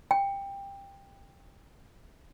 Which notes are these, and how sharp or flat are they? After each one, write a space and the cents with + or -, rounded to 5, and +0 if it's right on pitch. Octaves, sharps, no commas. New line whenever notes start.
G5 +15